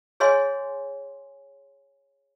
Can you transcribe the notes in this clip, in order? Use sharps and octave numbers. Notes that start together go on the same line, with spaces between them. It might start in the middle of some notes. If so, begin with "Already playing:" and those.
G#4 C#5 D#5 F5 G#5 C6